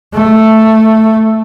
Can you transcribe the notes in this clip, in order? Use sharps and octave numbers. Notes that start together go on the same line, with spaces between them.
A3